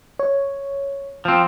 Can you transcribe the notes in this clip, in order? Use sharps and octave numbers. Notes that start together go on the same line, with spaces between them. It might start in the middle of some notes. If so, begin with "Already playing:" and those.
C#5
F3 C4